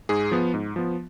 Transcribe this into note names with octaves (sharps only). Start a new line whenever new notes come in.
G#2 G#4
F3 B3
G#2
F3 B3